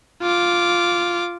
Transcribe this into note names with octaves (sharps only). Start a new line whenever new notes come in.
F4 D6